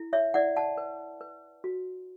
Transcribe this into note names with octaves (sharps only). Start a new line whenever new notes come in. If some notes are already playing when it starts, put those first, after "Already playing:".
Already playing: E4
C#5 E5
E4 D5 F#5
F#5 A5
B4
B4
F#4